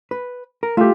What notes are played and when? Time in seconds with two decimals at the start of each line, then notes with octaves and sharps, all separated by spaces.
0.11 B4
0.63 A#4
0.77 A3 F4 G4